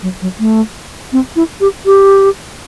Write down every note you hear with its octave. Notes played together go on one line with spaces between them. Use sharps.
F#3
F#3
A3
C4
E4
G4
G4